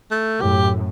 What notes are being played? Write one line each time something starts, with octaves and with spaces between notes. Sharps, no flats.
A3
F#2 A2 G4